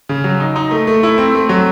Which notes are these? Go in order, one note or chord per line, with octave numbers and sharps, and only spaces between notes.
C#3
F#3
D#4
D#4
A3
A3
E4
C4
A3
F#3